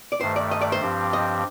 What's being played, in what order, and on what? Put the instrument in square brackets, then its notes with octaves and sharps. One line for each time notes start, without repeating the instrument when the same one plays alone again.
[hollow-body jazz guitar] D5
[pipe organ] G2 D#3 A3 [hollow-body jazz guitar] C5
[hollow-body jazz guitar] D5
D#5
D5
C5
[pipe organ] G2 F3 C4 G4
[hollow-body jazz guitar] D#5